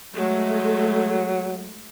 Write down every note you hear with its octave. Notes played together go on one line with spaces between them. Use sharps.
F#3 G#3 A3